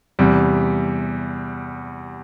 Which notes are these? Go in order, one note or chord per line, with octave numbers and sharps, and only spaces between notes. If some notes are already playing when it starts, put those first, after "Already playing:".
E2 C3 G3